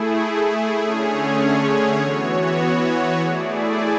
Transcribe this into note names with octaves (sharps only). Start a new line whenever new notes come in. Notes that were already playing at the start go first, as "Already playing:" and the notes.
Already playing: A3 E4 G#4
D3 A3 C#4 G#4 C#5
E3 B3 F#4 C#5
A3 E4 G#4 D5